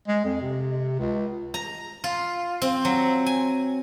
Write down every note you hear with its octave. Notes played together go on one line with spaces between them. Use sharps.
G#3
F2
C3
C#2
A#5
F4
C4
F#3
G#5